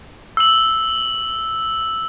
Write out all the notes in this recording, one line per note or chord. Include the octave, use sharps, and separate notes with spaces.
E6 F#7